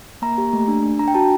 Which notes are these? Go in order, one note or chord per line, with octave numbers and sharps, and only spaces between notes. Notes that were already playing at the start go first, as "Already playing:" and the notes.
A#3 A#5
G4
A3
D4
D4
D4 A#5
G5
F#4 A5